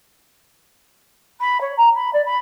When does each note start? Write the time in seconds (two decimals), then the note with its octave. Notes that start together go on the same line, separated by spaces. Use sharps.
1.40 B5
1.61 C#5
1.77 A#5
1.95 B5
2.13 D5
2.25 B5